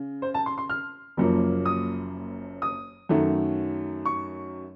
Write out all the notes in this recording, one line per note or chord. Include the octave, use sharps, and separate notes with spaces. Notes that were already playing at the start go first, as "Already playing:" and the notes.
Already playing: C#3
C5
A5
C6
C6
F6
F#1 F#2 F3 A#3
D#6
D#6
F#2 D#3 F#3 A3
C#6